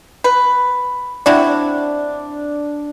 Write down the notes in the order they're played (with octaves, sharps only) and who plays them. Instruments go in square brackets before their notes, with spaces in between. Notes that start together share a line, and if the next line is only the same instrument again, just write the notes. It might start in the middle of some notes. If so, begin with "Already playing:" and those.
[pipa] B4
[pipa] C4 E4 F#4 [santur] D4